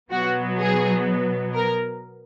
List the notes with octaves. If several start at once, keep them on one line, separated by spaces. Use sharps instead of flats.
B2 F#3 B3 F#4
G#4
A#4